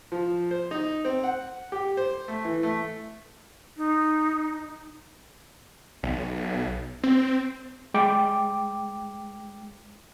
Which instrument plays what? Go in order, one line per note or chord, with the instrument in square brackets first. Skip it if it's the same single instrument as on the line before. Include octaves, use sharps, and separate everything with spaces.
[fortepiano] F3
C5
D#4
C4
F#5
G4
C5
A3
E3
A3
[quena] D#4
[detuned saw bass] B1
C4
[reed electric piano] G#3 G5 D6